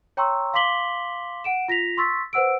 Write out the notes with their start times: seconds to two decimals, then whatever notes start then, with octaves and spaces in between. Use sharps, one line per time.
0.17 C#5 G5 A#5 C6 C#6 E6
0.54 F5 C6 D6 B6 F#7 G7
1.44 F#5 D7 E7
1.68 F4 A#6 B6 F7
1.97 C6 C#6 E6 A6 B6
2.33 B4 C5 F#5 E6 D7